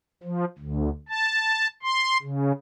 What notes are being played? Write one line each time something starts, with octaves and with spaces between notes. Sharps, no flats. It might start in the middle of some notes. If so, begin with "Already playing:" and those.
F3
D2
A5
C6
C#3